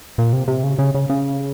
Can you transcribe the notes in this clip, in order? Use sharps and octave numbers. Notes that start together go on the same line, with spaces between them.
A#2
C3
C3
C#3
C#3
C#3
C#3